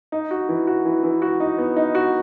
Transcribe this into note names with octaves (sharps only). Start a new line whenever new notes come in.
D#4
F#4
E3
F#4
E3
E3
F#4
D#4
B3
D#4
F#4